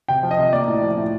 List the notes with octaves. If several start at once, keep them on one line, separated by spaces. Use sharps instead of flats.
C3 G5
F3
D#5
C3
A#3 D5
A2
F3
A2